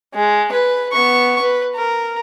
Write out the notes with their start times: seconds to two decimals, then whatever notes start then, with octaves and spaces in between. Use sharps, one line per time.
0.14 G#3
0.52 B4
0.93 B3 C#6
1.42 B4
1.75 A#4